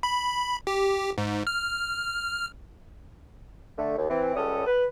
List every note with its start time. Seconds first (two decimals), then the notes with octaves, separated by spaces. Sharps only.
0.03 B5
0.67 G4
1.18 G#2
1.47 F6
3.78 D3 A3
3.97 D#2
4.09 E3 C4
4.35 C#2 G3 C#4 A4 C#5 D#6
4.66 B4